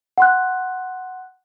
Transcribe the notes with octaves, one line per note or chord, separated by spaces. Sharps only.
F#5 C6 F#6